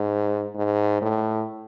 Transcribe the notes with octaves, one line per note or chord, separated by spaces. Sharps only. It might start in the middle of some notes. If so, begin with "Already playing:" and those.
Already playing: G#2
G#2
A2